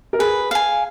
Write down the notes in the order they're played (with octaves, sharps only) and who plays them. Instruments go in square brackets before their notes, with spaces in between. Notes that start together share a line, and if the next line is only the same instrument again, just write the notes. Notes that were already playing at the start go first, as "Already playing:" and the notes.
[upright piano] A#4
[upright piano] G#4 [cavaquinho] B4
[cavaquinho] F5 G#5